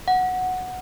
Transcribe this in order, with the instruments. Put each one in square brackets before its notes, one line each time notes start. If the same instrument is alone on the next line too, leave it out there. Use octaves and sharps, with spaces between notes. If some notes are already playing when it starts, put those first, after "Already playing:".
[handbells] F#5